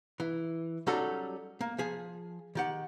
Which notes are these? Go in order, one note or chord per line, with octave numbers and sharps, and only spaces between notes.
E3
F#3 G3 C#4 D#4 F#4 A4
A#3
F3 G#4
D#3 G4 F#5